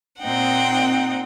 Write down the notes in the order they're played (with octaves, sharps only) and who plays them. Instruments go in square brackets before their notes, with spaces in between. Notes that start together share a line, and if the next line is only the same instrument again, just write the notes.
[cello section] A#2 C4 D#4 [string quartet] F#5 G5